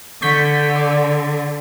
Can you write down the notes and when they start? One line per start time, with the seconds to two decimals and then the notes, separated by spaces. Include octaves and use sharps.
0.22 D3 C#6 G6 B6
0.76 D5